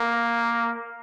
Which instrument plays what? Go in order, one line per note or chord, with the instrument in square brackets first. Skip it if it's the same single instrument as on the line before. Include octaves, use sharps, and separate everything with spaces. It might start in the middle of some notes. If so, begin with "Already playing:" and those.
Already playing: [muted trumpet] A#3